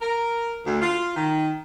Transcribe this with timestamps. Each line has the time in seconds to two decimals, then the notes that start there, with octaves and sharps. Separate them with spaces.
0.02 A#4
0.65 D2
0.81 F4
1.16 D#3